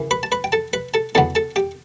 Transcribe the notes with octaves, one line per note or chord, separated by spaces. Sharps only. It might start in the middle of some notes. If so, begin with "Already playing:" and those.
Already playing: F#2 C#3 E3
B4 B5
A5
B4 B5
G5
A4 A5
B4 B5
A4 A5
E2 C#3 F#3 B3 A4 A5
A4 A5
G4 G5